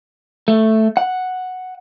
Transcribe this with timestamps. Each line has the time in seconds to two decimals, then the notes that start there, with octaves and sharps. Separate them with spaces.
0.48 A3
0.97 F#5